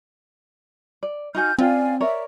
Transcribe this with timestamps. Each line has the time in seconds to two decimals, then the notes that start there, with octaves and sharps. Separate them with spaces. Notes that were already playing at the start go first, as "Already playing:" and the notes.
1.03 D5
1.35 D#4 F#4 G#5 F6 G6
1.59 C4 C#4 F4 D5 F5 G5 G#5
2.00 A#4 C#5 D5 E5